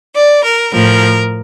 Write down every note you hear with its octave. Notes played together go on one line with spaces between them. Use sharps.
D5
A#4
A2 F3 A#4